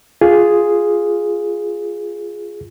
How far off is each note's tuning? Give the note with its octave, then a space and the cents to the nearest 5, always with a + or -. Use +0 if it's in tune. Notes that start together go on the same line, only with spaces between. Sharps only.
F4 +0 G#4 +0